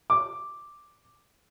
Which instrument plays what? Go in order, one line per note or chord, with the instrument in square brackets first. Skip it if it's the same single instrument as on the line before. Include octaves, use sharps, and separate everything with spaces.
[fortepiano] D6